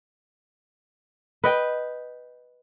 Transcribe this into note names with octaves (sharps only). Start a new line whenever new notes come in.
B4 D#5 G5